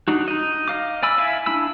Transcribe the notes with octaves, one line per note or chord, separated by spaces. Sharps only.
D4 D#4 F#4
D#4 D#5
D#5 F5 D6
D5 G#5 B5 E6
E4 E5 F5 G#5 B5
D4 E4 B5 E6